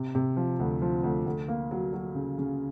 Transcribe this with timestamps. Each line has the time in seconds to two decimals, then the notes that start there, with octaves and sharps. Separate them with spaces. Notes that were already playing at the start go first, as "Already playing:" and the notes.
Already playing: C3
0.15 C3
0.37 F3
0.59 D2
0.82 F3
1.04 D2
1.26 D2
1.48 A#3
1.71 F#3
1.93 F#3
2.15 C#3
2.38 C#3